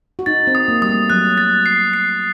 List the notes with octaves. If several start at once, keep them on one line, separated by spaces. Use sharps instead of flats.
F#4
D#4 A6
C4
D#6
A#3
G3 D#6
A3
F#3 F#6
A6
C7
C7